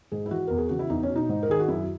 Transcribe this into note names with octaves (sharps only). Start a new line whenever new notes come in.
G#2 G#4
E4
E3 F#4
E2 A#4
G#4
C#3 E3 F#4
E4
E2 D#4
C#4
B2
D#4
G#2
A#4
D#3 G#4
F#4
F#2 E4